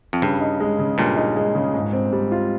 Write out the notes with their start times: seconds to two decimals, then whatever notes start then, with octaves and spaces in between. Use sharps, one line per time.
0.13 F2
0.22 G2 C#3
0.41 D#4
0.60 G#3
0.79 C#3
0.98 G2 A#2 C#3
1.16 D#4
1.36 G#3
1.55 C#3
1.74 G#2
1.93 C4
2.12 G3
2.32 F4